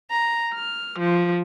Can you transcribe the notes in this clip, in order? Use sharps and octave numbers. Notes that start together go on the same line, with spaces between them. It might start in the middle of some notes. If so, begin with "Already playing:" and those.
A#5
F6
F3